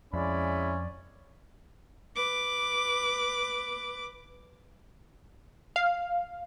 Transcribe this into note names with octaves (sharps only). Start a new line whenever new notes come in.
F2 G#3 C#4 E4 D5 B5
B4 D6
F5